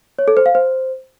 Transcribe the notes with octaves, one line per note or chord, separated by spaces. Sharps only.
C#5
A4
C5
F5
C5